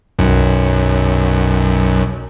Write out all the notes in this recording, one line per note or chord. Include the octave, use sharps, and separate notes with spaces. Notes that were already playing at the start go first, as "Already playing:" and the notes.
B1 F#2